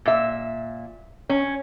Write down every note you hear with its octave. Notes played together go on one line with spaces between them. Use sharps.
A#2 E5
C#4